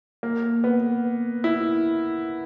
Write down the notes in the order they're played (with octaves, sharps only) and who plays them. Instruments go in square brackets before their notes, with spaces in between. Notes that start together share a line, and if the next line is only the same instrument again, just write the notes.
[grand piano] A#3
B3
E4